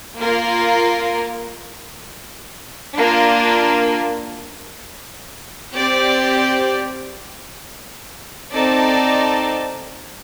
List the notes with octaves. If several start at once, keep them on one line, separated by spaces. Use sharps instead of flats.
A#3 F4 A#4
A#3 D4 F4 A#4
C4 G4 D5
C4 D#4 A4 D5 A5